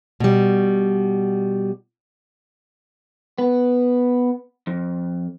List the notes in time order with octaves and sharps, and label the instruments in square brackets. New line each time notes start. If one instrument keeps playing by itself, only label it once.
[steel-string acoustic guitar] B2 G3
[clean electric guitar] B3
F2